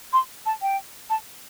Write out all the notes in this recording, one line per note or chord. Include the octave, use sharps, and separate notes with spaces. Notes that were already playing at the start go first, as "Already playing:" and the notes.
C6
A5
G5
A5